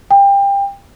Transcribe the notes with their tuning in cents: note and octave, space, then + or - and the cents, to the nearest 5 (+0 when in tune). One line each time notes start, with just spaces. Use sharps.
G5 +25